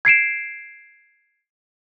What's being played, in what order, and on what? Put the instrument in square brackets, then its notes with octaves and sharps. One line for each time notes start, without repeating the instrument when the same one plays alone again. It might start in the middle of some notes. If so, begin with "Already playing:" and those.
[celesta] G#6 C7 D7 E7